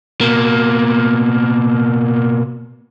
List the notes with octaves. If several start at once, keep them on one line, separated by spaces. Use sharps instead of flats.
B2 A#3